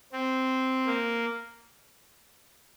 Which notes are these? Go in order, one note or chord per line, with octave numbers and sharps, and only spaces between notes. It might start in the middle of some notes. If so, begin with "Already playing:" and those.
C4
A#3